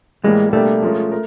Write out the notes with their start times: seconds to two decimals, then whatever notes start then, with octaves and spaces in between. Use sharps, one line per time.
0.24 A2 E3 G3 G#3 A#3
0.53 B2 G3 A3 A#3 D4 G4
0.83 F3 G#3 C#4 F4 A#4
1.12 A#4